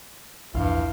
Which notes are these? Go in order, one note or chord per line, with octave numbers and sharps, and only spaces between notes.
A#1 E2 G2 E4 F4 F5